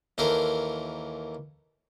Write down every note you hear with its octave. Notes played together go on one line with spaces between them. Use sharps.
D#2 E3 A4 A#4 C5